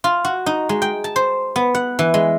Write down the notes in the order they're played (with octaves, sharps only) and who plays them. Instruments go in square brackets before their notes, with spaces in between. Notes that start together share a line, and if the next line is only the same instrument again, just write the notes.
[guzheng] F4
F#4
D#4
G#3
G5
A5
C5
B3
F#5
E3
G#3